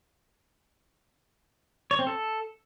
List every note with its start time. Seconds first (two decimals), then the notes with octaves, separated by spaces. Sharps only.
1.91 C#5
1.99 C4
2.07 A4